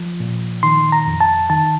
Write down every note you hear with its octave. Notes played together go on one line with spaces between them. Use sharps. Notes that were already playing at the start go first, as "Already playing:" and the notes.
Already playing: F3
A#2
D#3 C6
A#5
F2
A5
D#3 A5